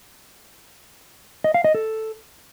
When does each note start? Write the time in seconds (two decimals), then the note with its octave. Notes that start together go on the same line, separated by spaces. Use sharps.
1.44 D#5
1.54 F5
1.64 D#5
1.75 A4